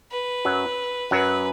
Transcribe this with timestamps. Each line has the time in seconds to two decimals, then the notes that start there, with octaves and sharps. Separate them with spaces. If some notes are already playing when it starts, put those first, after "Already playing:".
0.11 B4
0.45 F#2 F#3
1.11 F#2 F#3 B4